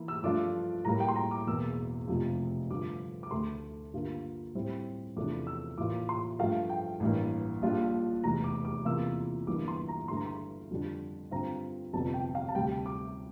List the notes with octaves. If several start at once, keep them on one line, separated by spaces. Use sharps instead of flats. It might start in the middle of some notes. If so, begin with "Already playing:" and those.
Already playing: E3 A#3 E4
E6
G2 F3 A3 D4 F4 D6
A2 G3 A#3 A#5
G5
C6
A#5
D6
E1 E2 E3 A#3 E6
F1 F2 C3 F3
G2 D3 F3 D6
D6
D2 D3 A3 C6
G2 D3 G3 A#3 F4
A2 G3 C4 E4
E2 C3 F3 A3 D4 D6
E6
A1 A2 E3 A#3 F4 D6
C6
G2 F3 A3 F5
G5
A1 G2 E3 A#3
A#1 A#2 G3 D4 F4
F1 E2 E3 A#5
D6
D6
E2 C3 E3 A#3 F4 E6
G1 G2 E3 A#3 D6
C6
A#5
G2 D3 A3 E4 C6
A#5
C6
F2 D3 G3 D4
G2 D3 G3 C4 F4 A#5
G1 F2 C3 A5
G5
F5
A5
D2 C3 G3 G5
D6